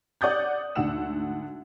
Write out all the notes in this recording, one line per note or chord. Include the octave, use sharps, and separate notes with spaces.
D5 F#5 D#6 G6 A6
D2 G#2 F#5 E6 E7